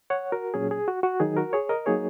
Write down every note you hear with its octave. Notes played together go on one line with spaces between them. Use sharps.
C#5 F#5
F#4 A#4
A#2 F#3 C#4 G#4
G#4
F#4
F#4
D#3 F#3 D#4 G#4
F#4 A#4
G#4 C#5
A#4 D#5
F#3 A#3 D#4 G#4 C#5